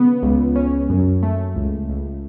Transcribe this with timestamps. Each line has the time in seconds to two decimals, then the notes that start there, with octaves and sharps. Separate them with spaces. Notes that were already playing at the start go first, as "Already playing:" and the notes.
Already playing: C#3 B3
0.22 C#2
0.55 C#4
0.89 F#2
1.23 A3
1.56 C#2
1.89 C#2